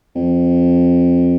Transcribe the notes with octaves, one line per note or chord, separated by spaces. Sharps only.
F2